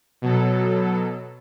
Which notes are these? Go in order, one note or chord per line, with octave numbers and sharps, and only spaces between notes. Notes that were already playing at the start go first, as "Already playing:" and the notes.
B2 F#3 A4